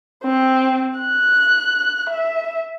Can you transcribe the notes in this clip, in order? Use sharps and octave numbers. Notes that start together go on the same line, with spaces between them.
C4
F#6
E5